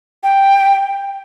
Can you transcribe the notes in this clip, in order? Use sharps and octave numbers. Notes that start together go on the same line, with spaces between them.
G5